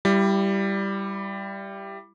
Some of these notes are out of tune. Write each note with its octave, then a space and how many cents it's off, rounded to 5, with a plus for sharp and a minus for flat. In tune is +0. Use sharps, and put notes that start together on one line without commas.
G3 +0 E4 +25